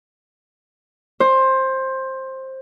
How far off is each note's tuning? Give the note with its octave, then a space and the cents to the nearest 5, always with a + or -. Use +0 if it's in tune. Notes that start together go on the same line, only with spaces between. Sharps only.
C5 +15